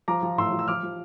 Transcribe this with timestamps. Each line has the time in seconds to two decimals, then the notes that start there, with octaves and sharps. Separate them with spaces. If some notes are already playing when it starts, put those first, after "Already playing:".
0.08 F3 A#5 D6
0.23 F3
0.38 A2 C6 E6
0.52 F3
0.59 E6
0.68 F3 D6 F6
0.83 F3